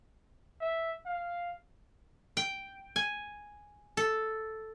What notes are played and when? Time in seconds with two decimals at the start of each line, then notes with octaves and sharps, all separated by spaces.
0.61 E5
1.06 F5
2.37 G5
2.96 G#5
3.97 A4